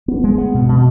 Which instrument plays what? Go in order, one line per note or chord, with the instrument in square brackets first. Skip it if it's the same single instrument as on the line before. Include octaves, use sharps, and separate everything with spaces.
[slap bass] B3
G#3
B3
B2
B2